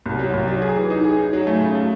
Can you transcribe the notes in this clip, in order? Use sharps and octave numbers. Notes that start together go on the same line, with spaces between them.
C2
F#3
C2
F#3
G#4
E3
D#4
G#4
D#4
F#3
A3
C#3
A3